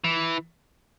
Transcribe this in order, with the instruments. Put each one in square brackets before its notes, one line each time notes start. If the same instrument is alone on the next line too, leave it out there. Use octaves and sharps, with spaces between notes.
[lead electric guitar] E3